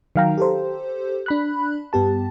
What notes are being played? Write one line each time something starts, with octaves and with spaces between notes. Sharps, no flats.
D#3 F#3 F5 G5 A#5
G4 A4 C5
D4 B5 F#6
G2 B3 G4 A5